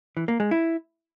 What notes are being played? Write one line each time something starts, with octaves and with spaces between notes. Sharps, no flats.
E3
A#3
G#3
E4